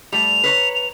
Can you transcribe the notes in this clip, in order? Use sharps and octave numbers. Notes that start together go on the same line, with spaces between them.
G3 A3 F7
B4 C#5 A#5